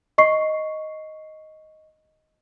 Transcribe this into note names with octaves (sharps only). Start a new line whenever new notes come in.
D#5 C#6 C7